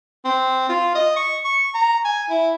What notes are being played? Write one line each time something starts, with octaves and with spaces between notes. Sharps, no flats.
C4
F4
D#5
C#6
C#6
A#5
G#5
E4